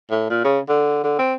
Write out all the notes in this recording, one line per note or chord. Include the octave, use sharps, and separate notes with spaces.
A2
A#2
C#3
D3
D3
C4